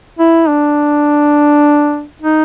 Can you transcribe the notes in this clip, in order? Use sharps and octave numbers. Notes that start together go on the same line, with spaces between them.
E4
D4
D#4